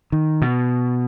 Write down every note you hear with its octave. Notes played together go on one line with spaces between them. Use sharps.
D#3
B2